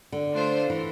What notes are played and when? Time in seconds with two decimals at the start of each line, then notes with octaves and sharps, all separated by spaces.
0.12 D3
0.32 A3 D4 F4 C5
0.70 E3